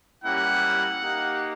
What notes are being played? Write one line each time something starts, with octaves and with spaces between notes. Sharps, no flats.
G3 A#3 C#4 E4 G4 F#5
A#3 D#4 G4